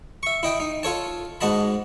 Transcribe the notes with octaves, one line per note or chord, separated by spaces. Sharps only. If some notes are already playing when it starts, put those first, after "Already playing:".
E5 C#6
E4 D#5 G5
D#4
F4 A4 C#5 A5
G#2 F#4 D#5 A5 B5